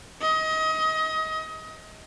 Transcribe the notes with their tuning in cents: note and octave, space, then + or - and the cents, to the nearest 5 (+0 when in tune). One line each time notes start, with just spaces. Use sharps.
D#5 +25